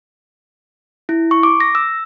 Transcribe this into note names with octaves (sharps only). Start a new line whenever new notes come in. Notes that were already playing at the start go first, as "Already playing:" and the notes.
E4
C#6
D6
A#6
E6